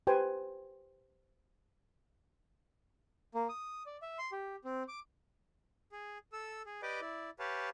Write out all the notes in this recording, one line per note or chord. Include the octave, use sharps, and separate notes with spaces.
G4 B4 C5 G5 G#5
A#3
D#6
D5
E5
C6
G4
C4
D6
G#4
A4 E6
G#4
G4 B4 D5 D#5 G5 D6
E4 D5
G4 B4 C#5 F5 A5